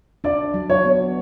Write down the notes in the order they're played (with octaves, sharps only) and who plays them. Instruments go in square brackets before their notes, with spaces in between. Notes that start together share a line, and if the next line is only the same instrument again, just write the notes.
[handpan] D4 [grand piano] D5
[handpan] F#3
[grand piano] C#5
[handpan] B3